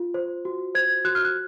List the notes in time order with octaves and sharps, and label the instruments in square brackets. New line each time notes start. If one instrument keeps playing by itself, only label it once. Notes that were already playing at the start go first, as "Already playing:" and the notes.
Already playing: [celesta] F4
C5
F#4
C5 G#6
F#4 F#6
F6
F#6